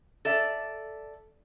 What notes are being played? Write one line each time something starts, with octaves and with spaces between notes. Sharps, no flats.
A4 D5 E5